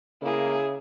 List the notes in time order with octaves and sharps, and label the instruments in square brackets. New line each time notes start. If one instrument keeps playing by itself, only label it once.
[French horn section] A2 G#3 A#3 [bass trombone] C#3 [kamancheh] E4 G#4